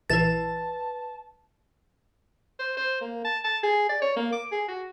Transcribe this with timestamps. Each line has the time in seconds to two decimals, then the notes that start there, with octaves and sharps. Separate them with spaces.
0.10 A#1 E3 B4 A5 A6 E7
2.59 C5
2.77 C5
3.01 A#3
3.25 A5
3.44 A5
3.63 G#4
3.89 D5
4.02 C#5
4.16 A#3
4.32 D6
4.52 G#4
4.68 F#4